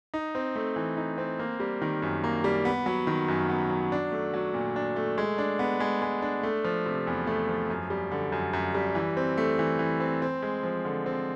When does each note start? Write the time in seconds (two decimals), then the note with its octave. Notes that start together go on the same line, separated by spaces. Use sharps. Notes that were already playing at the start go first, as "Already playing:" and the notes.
0.14 D#4
0.35 C4
0.56 A3
0.76 E3
0.97 D#4
1.18 C4
1.39 A#3
1.60 G3
1.82 D#3
2.02 F#2
2.24 A#3
2.44 G3
2.65 B3
2.86 F#3
3.07 D#3
3.28 F#2
3.50 B3
3.70 F#3
3.92 D4
4.12 A3
4.34 F#3
4.54 A#2
4.76 D4
4.96 A3
5.18 G#3
5.38 D4
5.59 B3
5.80 G#3
6.02 G#3
6.22 D4
6.43 A3
6.64 F3
6.86 C3
7.07 E2
7.27 A3
7.49 F3
7.70 F#2
7.90 G3
8.11 D3
8.32 F#2
8.53 F#2
8.75 G3
8.95 E3
9.17 C4
9.38 A3
9.59 E3
9.79 E3
10.00 C4
10.22 C4
10.42 G#3
10.63 F3
10.85 D3
11.06 C4